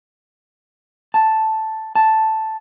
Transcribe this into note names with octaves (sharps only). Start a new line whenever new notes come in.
A5
A5